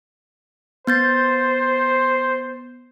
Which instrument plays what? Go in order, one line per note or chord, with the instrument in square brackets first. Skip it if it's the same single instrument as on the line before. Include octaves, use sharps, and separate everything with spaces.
[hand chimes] B3 G6 A6 [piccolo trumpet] C5